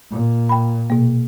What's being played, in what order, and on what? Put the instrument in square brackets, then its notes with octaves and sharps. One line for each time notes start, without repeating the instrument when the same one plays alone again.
[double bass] A#2
[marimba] G5 B5
B2 A#3